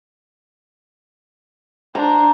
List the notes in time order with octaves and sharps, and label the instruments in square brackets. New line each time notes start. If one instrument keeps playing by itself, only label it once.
[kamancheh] D4 C5 [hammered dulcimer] A#5